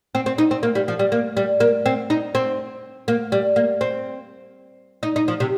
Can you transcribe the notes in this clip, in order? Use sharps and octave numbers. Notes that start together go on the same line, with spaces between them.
C4
C4
D#4
C4
A#3
G3
F3
G3
A#3
G3
A#3
C4
D#4
C4
A#3
G3
A#3
C4
D#4
D#4
F3
C3